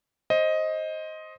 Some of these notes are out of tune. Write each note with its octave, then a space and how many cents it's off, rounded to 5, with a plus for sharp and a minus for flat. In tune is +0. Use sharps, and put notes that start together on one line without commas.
C5 +15 D#5 +10